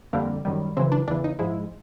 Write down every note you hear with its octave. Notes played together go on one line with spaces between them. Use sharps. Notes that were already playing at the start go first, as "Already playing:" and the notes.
F2 D3 G3 A#3
F#2 D#3 G3
F#2 C#3 E3 C4
D4
E2 C#3 E3 D4
D#4
G#2 F3 G#3 E4